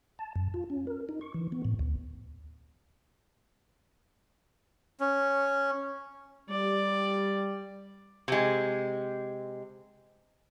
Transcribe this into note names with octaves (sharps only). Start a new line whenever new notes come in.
A5
F#2
F4
C#4
A#4
D#4
C#6
E3
B3
A2
D2
C#4
G3 D5
C3 G#3